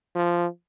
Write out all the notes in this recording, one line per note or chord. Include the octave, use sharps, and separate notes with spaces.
F3